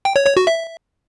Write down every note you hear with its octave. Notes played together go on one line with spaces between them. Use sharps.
G5
C#5
C#5
F#4
E5